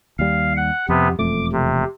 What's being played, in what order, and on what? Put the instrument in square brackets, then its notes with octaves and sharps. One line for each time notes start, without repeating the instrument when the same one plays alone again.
[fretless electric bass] D#2 G3 [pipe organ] F5
[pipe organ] F#5
[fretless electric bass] F2 [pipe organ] C3 B3
[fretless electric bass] E1 F2 A3 [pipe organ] D6
[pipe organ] C3